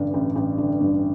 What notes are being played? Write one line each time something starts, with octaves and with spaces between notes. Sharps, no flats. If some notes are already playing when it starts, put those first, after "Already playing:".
Already playing: A1 G2 D3
A1
A1
D3
G2